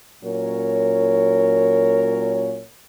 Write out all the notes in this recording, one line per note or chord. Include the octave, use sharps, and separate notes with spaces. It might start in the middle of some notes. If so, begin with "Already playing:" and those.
A#2 F#3 C#4 A#4 C#5